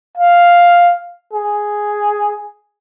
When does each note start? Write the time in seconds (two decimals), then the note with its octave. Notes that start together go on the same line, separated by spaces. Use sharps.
0.17 F5
1.33 G#4